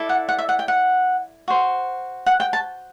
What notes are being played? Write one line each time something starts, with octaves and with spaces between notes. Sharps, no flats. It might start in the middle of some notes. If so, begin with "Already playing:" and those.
Already playing: E4 A4 D5
F#5
F#5
E5
F#5
G5
F#5
F#4 C5
F#5
G5
A5